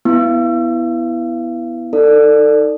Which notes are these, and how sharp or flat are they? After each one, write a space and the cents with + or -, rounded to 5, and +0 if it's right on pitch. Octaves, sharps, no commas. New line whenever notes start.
B3 +0 E4 +0
D#4 +0 A4 +30 D5 +10